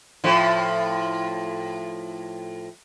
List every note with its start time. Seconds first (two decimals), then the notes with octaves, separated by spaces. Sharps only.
0.24 A2 F3